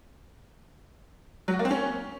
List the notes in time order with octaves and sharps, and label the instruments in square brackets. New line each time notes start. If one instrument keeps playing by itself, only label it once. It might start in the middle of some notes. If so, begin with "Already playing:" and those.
[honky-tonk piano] F#3
F#4
A#3
C4
C#4